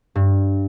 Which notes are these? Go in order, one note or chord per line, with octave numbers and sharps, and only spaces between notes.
G2